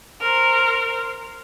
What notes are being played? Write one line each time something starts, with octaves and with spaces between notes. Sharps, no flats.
A#4 C5